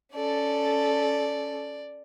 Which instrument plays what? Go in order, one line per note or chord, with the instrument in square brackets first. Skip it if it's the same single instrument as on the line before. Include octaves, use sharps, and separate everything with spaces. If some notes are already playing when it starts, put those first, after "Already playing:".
[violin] C#4 A4 [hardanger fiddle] D5